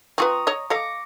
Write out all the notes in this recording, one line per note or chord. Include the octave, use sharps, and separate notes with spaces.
C4 F4 B4 A#5 C#6 D#6
C#5 D#5
A4 D#5 F5 D6 A#6 C#7